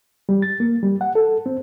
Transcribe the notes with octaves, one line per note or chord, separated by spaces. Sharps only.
G3
A6
A#3
G3
F#5
A4
C4